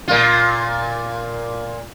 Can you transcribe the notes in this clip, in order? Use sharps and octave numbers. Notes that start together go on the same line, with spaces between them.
A#2 F4